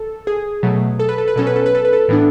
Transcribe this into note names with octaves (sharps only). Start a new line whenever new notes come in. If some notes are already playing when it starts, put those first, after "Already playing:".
Already playing: A4
G#4
B2 F#3 A3
A4
B4
A4
B4
B2 F#3 C#4 A4
B4
A4
B4
A4
B4
A4
A2 E3 B3 D4